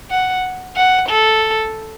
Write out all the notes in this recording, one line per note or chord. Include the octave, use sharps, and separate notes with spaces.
F#5
F#5
A4